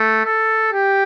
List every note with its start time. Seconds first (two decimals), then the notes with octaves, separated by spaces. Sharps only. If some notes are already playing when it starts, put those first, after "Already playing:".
Already playing: A3
0.25 A4
0.73 G4